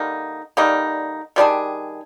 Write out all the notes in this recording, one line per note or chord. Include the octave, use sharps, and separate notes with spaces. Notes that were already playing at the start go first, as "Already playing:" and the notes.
Already playing: D3 G3 A#3 D#4
D3 G3 A#3 D#4
D#3 G3 D4 G#4